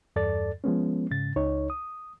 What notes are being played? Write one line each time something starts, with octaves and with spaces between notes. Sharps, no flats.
E2 G2 A4 D5 A6
F3 G#3 B3 C#4
G#2 C#3 A6
C#2 D#4 C#5
D#6